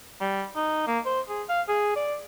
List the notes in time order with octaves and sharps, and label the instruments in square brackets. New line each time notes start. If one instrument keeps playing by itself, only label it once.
[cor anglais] G3
D#4
A#3
C5
G#4
F5
G#4
D5